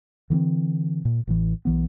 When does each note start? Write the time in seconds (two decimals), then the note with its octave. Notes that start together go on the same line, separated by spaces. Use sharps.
0.30 D3 E3 B3 C4
1.05 A#2
1.27 A1 A2 E3
1.65 B1 E3 B3